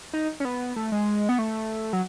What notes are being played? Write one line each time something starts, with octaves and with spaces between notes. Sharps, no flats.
D#4
C#4
B3
A3
G#3
B3
A3
F#3